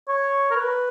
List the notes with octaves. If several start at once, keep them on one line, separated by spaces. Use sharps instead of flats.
C#5
A#4
B4